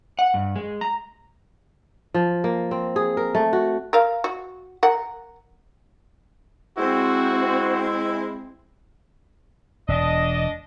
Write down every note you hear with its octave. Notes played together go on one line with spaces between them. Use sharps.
F#5
G2
G#3
A#5
F3
A#3
C4
G#4
A#4
A3
F#4
A#4 F5
F#4
A#4 F#5
G#3 C4 E4 F#4 C5
E1 D4 D#5